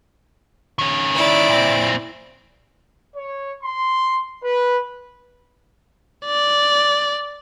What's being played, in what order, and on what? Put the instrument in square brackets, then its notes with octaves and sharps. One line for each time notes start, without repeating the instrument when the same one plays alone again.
[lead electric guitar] D#3 C#4
[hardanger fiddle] E4 D5
[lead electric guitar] A#2 C4
[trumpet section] C#5
C6
B4
[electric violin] D5